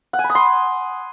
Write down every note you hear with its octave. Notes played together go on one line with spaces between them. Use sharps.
F#5
G#5
B5
D#6
C6